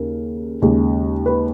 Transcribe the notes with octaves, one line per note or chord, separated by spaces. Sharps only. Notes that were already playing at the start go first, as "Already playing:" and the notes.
Already playing: D#2 C#3 A#4
D#2 C#3 G#3
B4